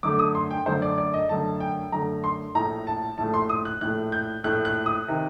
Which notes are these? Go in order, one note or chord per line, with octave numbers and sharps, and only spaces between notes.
F#2 D3 A3 D6
D#6
C6
G5
F#2 D3 A3 C5
D5
D5
D#5
F#2 D3 A3 A5
G5
F#2 D3 A3 A#5
C6
A#1 A2 A3 A#5
A5
A#1 A2 A3 A5
C6
D#6
F#6
A#1 A2 A3 F#6
G6
A#1 A2 A3 F#6
F#6
D#6
C3 D#3